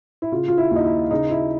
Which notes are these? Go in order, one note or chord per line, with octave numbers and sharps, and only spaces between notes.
E4
C#3 F4
F4
E4
D#2 D#4
E4
C#3 D#4
E4